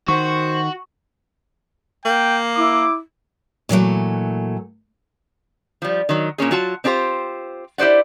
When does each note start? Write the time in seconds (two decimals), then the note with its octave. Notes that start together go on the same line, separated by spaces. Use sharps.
0.08 D#3 F#4 C5 C#6
2.05 A#3 G5
2.57 E4 D6
3.69 A#2 E3 F#3 A3
5.82 F3 G3
6.09 D#3 F#3
6.38 A#2 A#3 C#4 G#4
6.51 F#3 F4 F#4 A5
6.84 C4 D4 F4 G4 C5
7.78 E4 G4 C5 D5 F#5